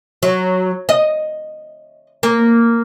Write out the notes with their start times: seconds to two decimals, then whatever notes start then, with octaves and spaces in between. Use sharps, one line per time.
0.23 F#3
0.89 D#5
2.23 A#3